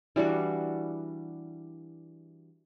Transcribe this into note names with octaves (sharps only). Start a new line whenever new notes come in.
E3 G3 D4 F#4